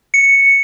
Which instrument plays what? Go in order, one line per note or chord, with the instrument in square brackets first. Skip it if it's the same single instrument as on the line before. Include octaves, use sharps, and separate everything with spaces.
[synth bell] C#7